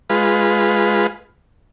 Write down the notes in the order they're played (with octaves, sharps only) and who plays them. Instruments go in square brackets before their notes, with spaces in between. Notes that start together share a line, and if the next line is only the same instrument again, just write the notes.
[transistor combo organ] G#3 F4 B4